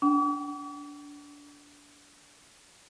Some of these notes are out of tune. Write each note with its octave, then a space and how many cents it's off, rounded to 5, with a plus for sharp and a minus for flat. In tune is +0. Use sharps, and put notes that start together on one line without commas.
D4 -20 F#5 +40 D6 -45